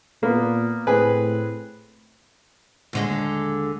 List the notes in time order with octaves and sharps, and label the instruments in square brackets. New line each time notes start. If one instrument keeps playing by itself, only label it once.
[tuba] A#2 [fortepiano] A#3 B3
[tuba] A2 [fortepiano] C4 G#4 B4
[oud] D#2 D3 G#3